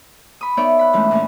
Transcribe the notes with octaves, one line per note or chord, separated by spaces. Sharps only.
B5 C#6 D#6
B3 D#4 C#5 D5 E5
B5 F#6
E3 G#3 A3 C#4 D4
A#2 E3 C#4